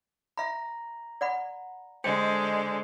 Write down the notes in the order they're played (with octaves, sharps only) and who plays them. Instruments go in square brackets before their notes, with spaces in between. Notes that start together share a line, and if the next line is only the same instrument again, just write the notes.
[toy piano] E5 B5 [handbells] A#5
[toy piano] D5 F#5 B5
[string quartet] D3 G#3 [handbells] C5 D#5 [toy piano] G5